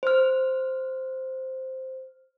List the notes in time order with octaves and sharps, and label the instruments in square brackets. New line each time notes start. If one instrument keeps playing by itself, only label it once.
[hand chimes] C5 F6